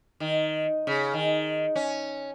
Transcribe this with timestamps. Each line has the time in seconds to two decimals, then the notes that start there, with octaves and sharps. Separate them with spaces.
0.20 D#3
0.87 C#3
1.14 D#3
1.76 C#4